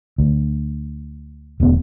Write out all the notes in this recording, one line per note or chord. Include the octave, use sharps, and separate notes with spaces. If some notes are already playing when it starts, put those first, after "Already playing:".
D2
E1 D2 B3